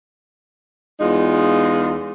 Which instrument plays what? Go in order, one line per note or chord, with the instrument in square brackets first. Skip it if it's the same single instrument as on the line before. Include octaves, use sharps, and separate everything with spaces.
[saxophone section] E2 G#3 D#4 F4